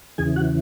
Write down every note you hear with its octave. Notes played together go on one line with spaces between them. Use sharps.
E2 C#3 E3 G#4 G#5
F#4 F#5